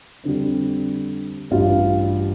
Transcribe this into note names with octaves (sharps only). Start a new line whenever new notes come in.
F2 D3 G3
A1 G2 G3 F4